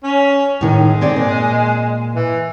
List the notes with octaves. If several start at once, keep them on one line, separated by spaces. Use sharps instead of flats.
C#4
A2 D#3 G#3
C4 C#5 D5
A#2
E3